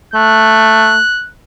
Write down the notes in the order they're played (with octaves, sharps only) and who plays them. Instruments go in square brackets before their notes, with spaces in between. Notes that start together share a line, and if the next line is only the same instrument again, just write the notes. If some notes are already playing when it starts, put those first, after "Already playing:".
[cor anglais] A3 [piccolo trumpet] F#6